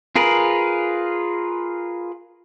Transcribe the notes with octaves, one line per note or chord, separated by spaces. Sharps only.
F4 G#4 A#4 B4